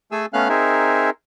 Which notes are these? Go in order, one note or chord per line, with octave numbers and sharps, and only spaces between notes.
A3 G#4 A4 G#5 E6
A3 B3 C#4 F5 F6 F#6
C4 D#4 G#4 A#4 E5